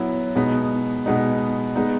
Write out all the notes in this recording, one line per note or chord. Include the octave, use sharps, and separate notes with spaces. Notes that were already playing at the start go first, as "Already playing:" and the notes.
Already playing: F#3 B3 E4
B2 G#3 B3 D#4
B2 G#3 B3 D#4
G#3 B3 D#4